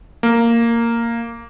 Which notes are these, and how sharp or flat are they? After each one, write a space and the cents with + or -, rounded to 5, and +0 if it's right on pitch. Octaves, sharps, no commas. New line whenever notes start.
A#3 -10